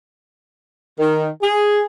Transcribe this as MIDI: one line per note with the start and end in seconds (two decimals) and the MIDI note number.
0.99 1.27 51
1.42 1.82 68